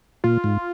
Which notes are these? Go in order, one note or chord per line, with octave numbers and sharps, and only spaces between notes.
A#2 F4
G#2